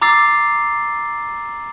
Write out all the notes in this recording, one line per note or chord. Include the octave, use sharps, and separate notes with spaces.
A#5 D6 E6 A6 C7